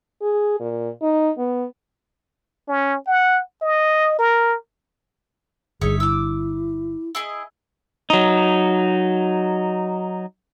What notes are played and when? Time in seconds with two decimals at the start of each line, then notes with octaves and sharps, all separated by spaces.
0.22 G#4
0.60 A#2
1.02 D#4
1.38 B3
2.68 C#4
3.07 F#5
3.62 D#5
4.19 A#4
5.81 G1 G2 D#4 G#4 C#5 E5
6.00 E4 D6 E6
7.15 E4 G#4 D#5
8.10 F#3 D#4